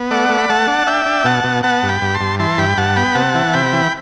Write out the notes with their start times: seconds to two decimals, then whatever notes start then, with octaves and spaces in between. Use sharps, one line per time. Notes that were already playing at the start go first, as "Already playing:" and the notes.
Already playing: B3
0.11 A3 D5 F#5
0.29 A3
0.38 B5
0.49 A3 F#5 A5
0.68 D4
0.87 D4 E5 G5
1.06 D4
1.25 B2 F#5 A5
1.44 B2
1.63 B3 F#5 A5
1.83 G2
1.89 G5 B5
2.02 G2
2.14 A5 C6
2.21 G2
2.39 E3 A5 C6
2.58 G2 G5 B5
2.77 G2 F#5 A5
2.96 B3 G5 B5
3.15 C3 F#5 A5
3.34 E3
3.53 C3 G5 B5
3.73 E3